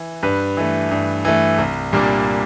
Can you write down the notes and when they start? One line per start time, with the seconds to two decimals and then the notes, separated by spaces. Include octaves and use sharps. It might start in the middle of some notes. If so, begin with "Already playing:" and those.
Already playing: E3
0.23 G2 B4
0.57 E3 A3
0.91 G2
1.25 E3 A3
1.58 C2
1.93 A#2 G3 A#3 D4